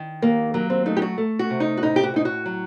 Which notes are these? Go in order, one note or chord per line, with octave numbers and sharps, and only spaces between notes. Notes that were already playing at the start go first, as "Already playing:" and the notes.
Already playing: D#3
D#2 A#3
F#3 A#3
C4
A3 D#4
G4
F#4
A3
F#4
C3
D#4
F#4
A2 D#4
G4
F#4
A2 D#4
F#4
F#3